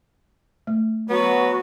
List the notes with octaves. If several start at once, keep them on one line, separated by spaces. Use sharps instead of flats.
A3
F#3 B3 F#4